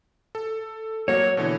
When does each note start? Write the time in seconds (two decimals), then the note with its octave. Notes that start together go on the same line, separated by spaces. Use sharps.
0.35 A4
1.08 F#3 A#3 F#4 C#5
1.37 B2 D3 E3